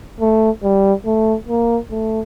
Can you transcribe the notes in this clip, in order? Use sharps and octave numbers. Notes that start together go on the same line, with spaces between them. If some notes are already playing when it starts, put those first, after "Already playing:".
A3
G3
A3
A#3
A3